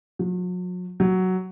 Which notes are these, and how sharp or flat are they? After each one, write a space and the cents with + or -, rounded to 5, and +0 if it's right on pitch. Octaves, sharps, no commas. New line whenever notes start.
F#3 -40
F#3 +5